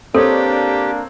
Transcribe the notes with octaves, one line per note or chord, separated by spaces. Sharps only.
A#3 C4 D4 G4 A4 C#5